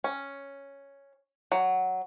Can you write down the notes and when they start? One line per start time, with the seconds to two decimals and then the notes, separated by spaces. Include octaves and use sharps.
0.04 C#4
1.52 F#3